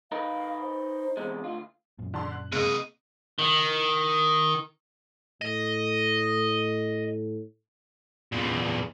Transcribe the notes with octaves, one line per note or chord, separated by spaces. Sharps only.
D#4 A#4 B4 F5
C5
E2 C3 G#3
D2 F4
F#2 A#2
D3 A5 C6
F#6
C3 G#3 A#3 D#5 D#7
D#3
A2 D#5
E2 A#2